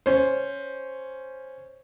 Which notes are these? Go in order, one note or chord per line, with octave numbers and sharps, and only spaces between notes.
C#4 C5